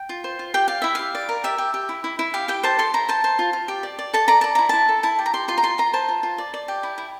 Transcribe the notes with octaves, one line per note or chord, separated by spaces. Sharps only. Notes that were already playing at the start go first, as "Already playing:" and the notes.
Already playing: G5
F4
C5
F4
G4 G5
D5 F5
E4 E5
G4 F5
D5
A#4
G4 E5
G4
G4
E4
E4
E4
G4 F5
G4 G5
C5 A5
A4 C6
E4 A#5
C5 A5
C5
F4
F4
G4
D5
D5
A4 A5
D5 A#5
D5 A5
E4 A#5
E4 A5
A4
E4 A5
G4
A#5
G4 C6
F4 C6
A#5
F4 C6
F4 A#5
C5 A5
F4
F4
D5
D5
G4
E4
E4